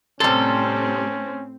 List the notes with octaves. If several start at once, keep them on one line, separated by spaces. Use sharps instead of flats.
A2 C3 G3 C4 C#4 A4